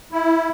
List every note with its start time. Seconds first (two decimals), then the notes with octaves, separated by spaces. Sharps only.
0.12 E4